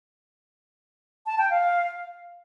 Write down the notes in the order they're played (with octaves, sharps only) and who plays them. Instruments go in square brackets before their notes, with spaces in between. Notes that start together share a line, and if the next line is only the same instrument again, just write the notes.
[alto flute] A5
G5
F5